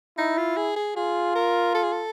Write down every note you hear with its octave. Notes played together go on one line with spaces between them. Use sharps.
D#4 E4
F4
G#4
G#4
F4 G#4
A#4
A4
G#4
A4